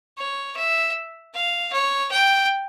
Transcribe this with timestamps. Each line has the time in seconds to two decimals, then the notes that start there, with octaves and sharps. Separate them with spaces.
0.18 C#5
0.56 E5
1.34 F5
1.73 C#5
2.11 G5